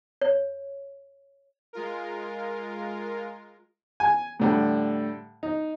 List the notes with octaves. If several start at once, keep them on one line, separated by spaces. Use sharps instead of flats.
C#5
G#3 F4 A#4
G#5
A2 D3 G3
D#4